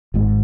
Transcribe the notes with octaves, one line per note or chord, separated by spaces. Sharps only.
G#1 G#2